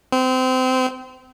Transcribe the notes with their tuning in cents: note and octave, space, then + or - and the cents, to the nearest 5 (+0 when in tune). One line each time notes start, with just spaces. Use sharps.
C4 -25